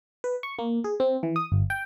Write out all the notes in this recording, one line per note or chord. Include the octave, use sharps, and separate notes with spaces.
B4
C#6
A#3
G#4
C4
E3
D#6
G1
G5